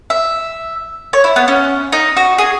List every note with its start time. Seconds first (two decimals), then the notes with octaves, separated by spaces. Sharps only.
0.10 E5
1.13 C#5
1.24 E4
1.36 B3
1.48 C#4
1.92 D#4
2.17 F#4
2.38 G#4